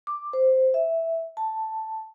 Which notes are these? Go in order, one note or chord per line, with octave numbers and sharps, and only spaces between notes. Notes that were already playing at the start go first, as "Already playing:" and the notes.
D6
C5
E5
A5